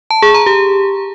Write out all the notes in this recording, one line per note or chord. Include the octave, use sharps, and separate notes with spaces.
A5
G#4
A#5
G4